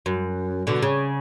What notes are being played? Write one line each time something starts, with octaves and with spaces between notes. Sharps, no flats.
F#2
B2 D3
C#3